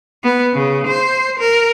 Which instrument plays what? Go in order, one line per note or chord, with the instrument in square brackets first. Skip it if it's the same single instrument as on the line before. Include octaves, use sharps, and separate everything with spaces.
[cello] B3
C#3
C5
A#4